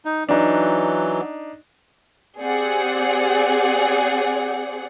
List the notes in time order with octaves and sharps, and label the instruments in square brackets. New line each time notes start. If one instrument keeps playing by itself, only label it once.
[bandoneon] D#4
[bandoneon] E3 F#3 [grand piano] D4 D#4
[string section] C4 G4 G#4 D5 F#5